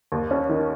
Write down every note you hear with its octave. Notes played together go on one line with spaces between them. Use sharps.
D#2
C#4
D#3